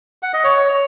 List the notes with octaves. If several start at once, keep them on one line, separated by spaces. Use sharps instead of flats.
F#5
D#5
C#5